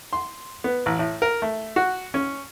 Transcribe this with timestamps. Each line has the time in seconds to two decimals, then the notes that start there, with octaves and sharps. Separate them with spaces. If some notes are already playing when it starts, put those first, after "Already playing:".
0.13 C6
0.64 B3
0.86 A1
0.99 A2
1.22 A#4
1.42 A3
1.76 F#4
2.14 C#4